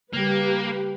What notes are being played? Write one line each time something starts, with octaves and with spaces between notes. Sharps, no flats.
C#3 G3 A#3 G4 B4